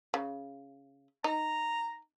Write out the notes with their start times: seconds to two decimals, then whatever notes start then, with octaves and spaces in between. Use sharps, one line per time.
0.14 C#3
1.24 D#4 A#5